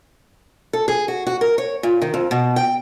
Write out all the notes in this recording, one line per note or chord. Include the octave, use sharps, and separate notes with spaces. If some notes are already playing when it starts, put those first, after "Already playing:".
A4
G#4
F#4
F#4
A#4
C#5
A#2
D#3
F2
B2
G5